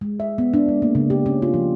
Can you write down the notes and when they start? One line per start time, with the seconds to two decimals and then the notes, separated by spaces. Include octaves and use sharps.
0.01 G#3
0.20 E5
0.38 B3
0.54 D4
0.68 G#3
0.82 A#3
0.95 C#3
1.10 G4
1.26 C#4
1.42 F4
1.54 F3